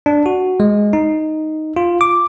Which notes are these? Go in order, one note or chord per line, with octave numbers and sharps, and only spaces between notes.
D4
F#4
G#3
D#4
F4
D6